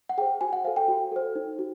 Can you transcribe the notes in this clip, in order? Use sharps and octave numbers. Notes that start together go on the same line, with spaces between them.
F#5
G#4 C5 G5
F#4 G#5
F#5
A4 C5 F5
G5
F#4
A4 C5
D#4
F#4